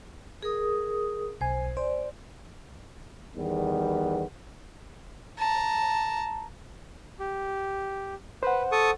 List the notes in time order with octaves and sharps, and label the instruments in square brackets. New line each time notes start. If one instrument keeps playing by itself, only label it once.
[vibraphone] G#4 A#4 D#6
[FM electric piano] B1 G#5 [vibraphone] C5
[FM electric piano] C5 [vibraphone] D5
[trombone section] E2 D#3 G3 B3
[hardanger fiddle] A5 A#5
[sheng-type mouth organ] G4
[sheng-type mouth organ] B4 [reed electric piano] C5 F#5
[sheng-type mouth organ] A4 C#6 D#6